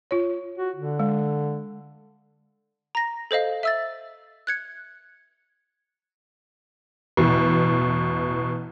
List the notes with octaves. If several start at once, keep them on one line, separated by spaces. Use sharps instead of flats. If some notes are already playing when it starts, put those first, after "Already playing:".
F4 C#5
F#4
D3
G#3
A#5 A#6
A4 C5 D#5 F5
E5 E6 A6
F#6 G#6 C#7
A1 E2 B2